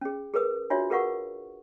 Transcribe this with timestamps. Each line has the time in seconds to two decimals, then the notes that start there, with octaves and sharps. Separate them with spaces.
0.01 C#4 G#4
0.34 G#4 A#4 B4 D#6
0.70 D4 F4 F#4 C#5 E5
0.90 G#4 A#4 B4 F5 F#5 C#6